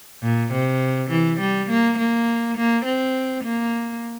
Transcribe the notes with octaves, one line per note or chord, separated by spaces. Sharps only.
A#2
C3
E3
G3
A#3
A#3
A#3
C4
A#3